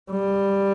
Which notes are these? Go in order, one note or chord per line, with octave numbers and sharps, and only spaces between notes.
G3